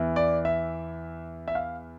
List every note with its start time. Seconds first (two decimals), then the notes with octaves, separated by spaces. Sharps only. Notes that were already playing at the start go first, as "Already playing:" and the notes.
Already playing: E2 E3
0.16 D5
0.45 E5
1.48 E5
1.55 F5